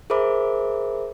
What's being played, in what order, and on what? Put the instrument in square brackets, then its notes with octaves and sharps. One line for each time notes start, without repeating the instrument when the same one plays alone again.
[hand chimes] G#4 A#4 C5 E5 B5 D6